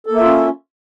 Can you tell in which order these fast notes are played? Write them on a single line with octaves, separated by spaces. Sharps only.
A4 A#3 E5 F4 C#4